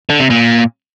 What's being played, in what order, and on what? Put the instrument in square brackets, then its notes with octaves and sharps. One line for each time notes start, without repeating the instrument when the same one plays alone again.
[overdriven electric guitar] D3
C3
A#2